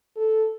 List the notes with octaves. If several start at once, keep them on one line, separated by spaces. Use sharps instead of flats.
A4